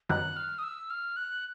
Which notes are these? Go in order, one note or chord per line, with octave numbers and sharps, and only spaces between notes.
F#2 D#3 G3 B3 F#6
F6
D#6
E6
F6
F#6